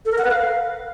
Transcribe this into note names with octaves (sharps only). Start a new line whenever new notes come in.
A4
A#4
F#5
B4
F5